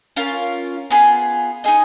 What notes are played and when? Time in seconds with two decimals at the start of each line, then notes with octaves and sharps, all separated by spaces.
0.16 C#4 F4 A#4 F5
0.90 B3 F4 G#4
1.64 D#4 G#4 D#5